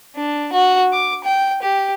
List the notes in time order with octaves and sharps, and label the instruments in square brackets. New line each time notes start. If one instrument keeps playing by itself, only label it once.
[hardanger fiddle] D4
F#4
D6
G5
G4